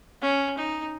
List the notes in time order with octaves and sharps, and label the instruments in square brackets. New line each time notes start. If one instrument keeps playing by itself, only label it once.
[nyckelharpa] C#4
D#4